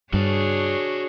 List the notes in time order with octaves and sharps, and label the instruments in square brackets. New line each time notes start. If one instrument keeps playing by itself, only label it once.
[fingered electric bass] G2 [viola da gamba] D4 G#4 C#5 [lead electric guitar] F#4 A5